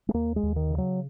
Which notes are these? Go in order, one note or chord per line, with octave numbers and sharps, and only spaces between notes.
G#3
D#2 A#3
G#3
D#2
D#3
C#3
F#3